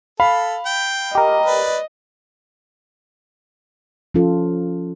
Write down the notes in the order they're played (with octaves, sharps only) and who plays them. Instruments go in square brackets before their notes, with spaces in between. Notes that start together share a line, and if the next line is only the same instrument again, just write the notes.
[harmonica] A4 [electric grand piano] F5 B5
[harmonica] G5
[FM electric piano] G4 A#4 [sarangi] D#5
[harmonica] B4 D5
[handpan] F3 C#4 F4 A4